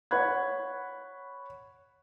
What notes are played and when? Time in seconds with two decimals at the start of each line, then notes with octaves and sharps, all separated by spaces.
0.11 C#5 F#5 B5 F#6 G#6